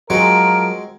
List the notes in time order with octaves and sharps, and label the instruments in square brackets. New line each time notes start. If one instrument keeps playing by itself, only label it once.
[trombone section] F3 A#4 [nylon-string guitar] F#3 G#4 [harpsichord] G#3 C4 F#4 [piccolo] D7